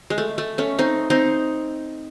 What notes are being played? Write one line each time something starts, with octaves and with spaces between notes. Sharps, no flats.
G#3
A3
A3
A3 C#4
C4 D#4
C4 D#4